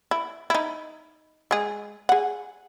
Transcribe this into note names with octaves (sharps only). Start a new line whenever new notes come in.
E4
D#4 E4
G#3 G#4
G#4 F#5